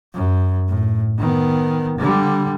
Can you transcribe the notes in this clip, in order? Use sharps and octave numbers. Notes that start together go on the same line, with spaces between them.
F#2
A2
D#3 B3
D3 G3